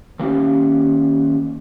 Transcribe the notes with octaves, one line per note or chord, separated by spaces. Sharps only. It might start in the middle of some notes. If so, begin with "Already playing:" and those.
D#3 A#3 C#4 G4